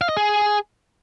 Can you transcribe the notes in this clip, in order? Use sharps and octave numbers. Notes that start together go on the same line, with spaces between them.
F5
D#5
G#4